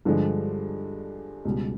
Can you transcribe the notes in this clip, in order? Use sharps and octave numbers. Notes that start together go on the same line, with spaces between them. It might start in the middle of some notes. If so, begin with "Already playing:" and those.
G2 D3 F3 G#3
C#2 B2 G3